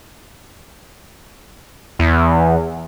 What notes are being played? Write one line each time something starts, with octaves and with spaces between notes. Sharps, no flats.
E2